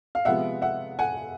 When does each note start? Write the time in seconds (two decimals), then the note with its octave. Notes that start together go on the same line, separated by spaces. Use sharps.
0.15 F5
0.25 C3 F3 G#3 B3 E5 F#5
0.62 E5 F#5
0.99 F#5 G#5